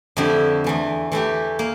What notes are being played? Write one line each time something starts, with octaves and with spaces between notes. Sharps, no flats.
F2 D3 A3 E4 G4
E2 E3 A3
E3 A3 E4 G4
A#3